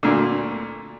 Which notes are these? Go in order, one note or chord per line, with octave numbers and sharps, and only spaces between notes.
D2 A#2 D3